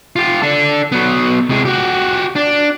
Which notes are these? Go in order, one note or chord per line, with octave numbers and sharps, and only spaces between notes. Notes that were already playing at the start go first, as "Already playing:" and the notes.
F4 G4
D4 A4
F#3 B3
C3 G#3
F#4 G4
D4